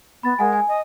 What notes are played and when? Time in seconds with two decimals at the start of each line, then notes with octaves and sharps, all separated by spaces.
0.23 B3 B5 A6
0.39 G#3 A#4 F#5 G#5
0.53 G#5
0.68 D#5